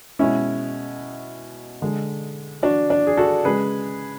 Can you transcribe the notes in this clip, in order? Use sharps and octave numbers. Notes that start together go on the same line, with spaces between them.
B2 G#3 C#4 E4
D3 G#3
D4 F#4
D4
G#4
F#4 A4
C#3 G#3 G#4 B4